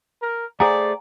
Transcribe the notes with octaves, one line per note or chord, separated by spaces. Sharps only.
A#4
A3 G#4 C5 D5 F#5 G#5 A#5